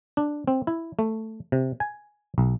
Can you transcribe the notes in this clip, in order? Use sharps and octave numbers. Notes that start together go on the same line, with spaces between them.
D4
C4
E4
A3
C3
G#5
B1